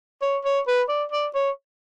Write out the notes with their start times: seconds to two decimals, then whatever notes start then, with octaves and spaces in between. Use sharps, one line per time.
0.22 C#5
0.44 C#5
0.67 B4
0.89 D5
1.12 D5
1.35 C#5